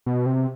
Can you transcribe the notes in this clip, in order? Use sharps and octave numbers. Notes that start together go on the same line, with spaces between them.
B2
C3